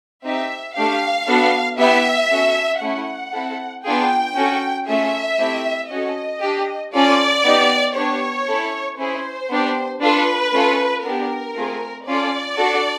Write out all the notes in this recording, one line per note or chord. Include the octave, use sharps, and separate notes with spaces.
C4 D#4 G4 E5
A3 D4 G4 F5
B3 D4 F#4 A4
B3 E4 G4 E5
C#4 F#4 A4
A3 C#4 E4 F#5
C4 E4 A4
B3 D4 F4 G#4 G5
C#4 F#4 A4
A3 C#4 F4 G#4 E5
A3 C4 E4 G4
C#4 F#4 A4 D#5
D4 G4
C#4 F4 A4 D5
B3 D#4 G4
B3 D4 G4 C#5
C#4 E4 A4
C#4 E4 G#4 C5
B3 D4 G4
D4 F4 A4 B4
A3 C#4 F4 A4
B3 D4 G4 A#4
A3 C4 F4 G#4
C#4 F4 A4 D5
D4 F#4 A4